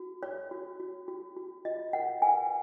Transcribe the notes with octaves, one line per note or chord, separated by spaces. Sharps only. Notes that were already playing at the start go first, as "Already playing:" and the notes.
Already playing: F#4
C#5
F#4
F#4
F#4
F#4
F4 D#5
A#4 F#5
B4 G#5